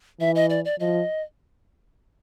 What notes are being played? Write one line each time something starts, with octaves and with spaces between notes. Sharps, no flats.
E3 E5
D#5
D5
D5
F3 D#5